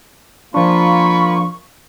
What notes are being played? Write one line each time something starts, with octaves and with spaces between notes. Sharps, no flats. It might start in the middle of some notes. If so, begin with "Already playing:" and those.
F3 A#3 D4 F4 B5 C#6